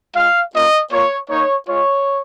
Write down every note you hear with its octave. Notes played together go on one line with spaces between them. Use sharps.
G#3 F4 F5
A#3 C#4 F4 D#5
A#3 F4 C#5
A#3 D#4 C#5
G#3 F4 C#5